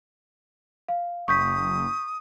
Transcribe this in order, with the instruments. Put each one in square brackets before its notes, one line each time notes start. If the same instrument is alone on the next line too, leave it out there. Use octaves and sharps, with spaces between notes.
[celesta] F5
[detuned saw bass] F#1 [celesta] C#6 G6 B6 [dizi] D#6